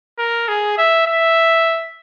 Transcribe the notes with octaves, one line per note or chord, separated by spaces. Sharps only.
A#4
G#4
E5
E5